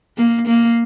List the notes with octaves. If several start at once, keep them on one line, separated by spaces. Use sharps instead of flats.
A#3
A#3